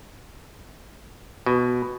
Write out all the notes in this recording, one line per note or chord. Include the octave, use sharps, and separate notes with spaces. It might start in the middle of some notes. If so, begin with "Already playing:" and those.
B2